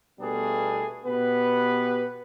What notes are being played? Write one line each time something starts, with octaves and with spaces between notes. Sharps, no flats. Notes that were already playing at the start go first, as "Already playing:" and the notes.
B2 G3 A3 B3 D4 G#4
B2 B3 G4 B4